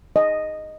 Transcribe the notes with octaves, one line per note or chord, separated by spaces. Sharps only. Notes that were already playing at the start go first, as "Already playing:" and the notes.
D#5